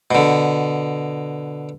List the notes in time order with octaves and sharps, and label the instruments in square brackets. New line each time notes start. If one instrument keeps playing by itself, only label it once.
[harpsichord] B2 D3